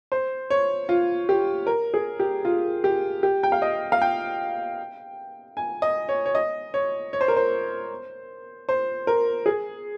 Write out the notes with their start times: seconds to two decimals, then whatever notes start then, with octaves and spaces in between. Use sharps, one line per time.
0.12 C5
0.50 C#5
0.89 F4
1.29 G4
1.67 A#4
1.94 G#4
2.20 G4
2.45 F4
2.84 G4
3.23 G4
3.43 G5
3.52 F5
3.62 D#5
3.92 F5
4.02 G5
5.57 G#5
5.82 D#5
6.09 C#5
6.26 C#5
6.35 D#5
6.74 C#5
7.13 C#5
7.21 C5
7.28 A#4
7.37 C5
8.69 C5
9.07 A#4
9.46 G#4